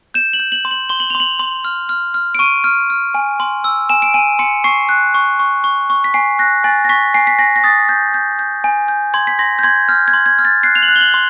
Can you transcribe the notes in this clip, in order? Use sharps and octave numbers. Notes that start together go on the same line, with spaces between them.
G6 E7
F#7
G6
F#7
C6
F#7
C6 G7
F#7
C6 F7
F#7
C6
F6
F6
F6
D7
C#6 D#7
F6
F6
G#5
C6
E6
G#5 E7
D7
G#5 D#7
C6 C#7
C#6 C7
F#6
C#6
C#6
C#6
C#6
B6
G#5 C7
F#6 A#6
G#5 A6
A#6
C#6 B6
G#5 C7
B6
G#5 A#6
A#6
D#6 A6
G6
G6
G6
G#5
G6
C6 G#6
B6
C6 A#6
G6
C6 G#6
F6 G6
G#6
C6
G#6
F6
A6
F#6 C7
F7
F#7
F#6
G7
F#7
C6